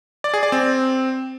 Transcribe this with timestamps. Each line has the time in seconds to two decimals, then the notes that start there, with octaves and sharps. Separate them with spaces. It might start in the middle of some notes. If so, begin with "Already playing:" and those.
0.24 D5
0.34 G#4
0.43 D5
0.52 C4